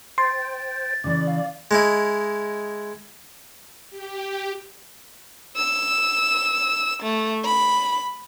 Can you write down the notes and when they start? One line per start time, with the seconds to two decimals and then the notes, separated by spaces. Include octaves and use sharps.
0.18 C5 G5 C6 A6
1.04 C#3 E3 D5
1.27 F5
1.71 G#3 D#4 E4
3.91 G4
5.56 E6
7.02 A3
7.45 B5